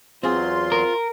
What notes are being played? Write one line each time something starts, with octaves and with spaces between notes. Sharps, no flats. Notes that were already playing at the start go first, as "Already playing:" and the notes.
E2 F#3 C4 F4 G#4 C6
A#4